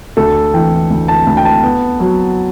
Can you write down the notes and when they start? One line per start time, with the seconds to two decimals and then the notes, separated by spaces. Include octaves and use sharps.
0.17 D2 A4
0.54 E3 G5
0.90 D2
1.08 A5
1.27 D2
1.37 G5
1.45 A5
1.63 B3
2.00 F#3